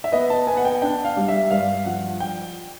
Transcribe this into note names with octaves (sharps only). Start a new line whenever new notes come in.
E5
B3 D#5
A5
B3 G#5
F#5
G5
D4 G5
F5
G3
E5
G2 F5
F3 F#5
G5